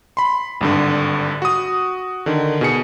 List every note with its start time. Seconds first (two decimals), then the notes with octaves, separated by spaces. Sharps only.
0.17 B5 C6
0.61 G#1 G2 D3
1.42 F#4 D#6
2.26 D3 D#3
2.61 B2 G#4 C#7